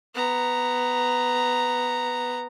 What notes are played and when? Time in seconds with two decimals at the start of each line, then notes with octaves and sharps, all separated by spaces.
0.15 B3 A#5